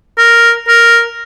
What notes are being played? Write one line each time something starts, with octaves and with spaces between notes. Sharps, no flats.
A#4
A#4